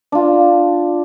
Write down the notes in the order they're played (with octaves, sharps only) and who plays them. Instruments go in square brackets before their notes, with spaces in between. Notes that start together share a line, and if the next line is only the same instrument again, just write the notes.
[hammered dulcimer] D4 F4